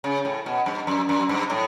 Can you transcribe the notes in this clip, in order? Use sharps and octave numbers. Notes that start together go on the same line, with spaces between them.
C#3
A2
B2
G2
F#2
F#2
G2
A2